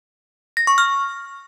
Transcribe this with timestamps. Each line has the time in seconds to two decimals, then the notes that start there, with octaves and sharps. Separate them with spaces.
0.57 A#6
0.67 C#6
0.78 F6